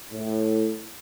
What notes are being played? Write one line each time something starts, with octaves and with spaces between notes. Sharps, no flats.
A2